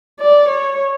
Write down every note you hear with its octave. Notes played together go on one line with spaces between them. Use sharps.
D5
C#5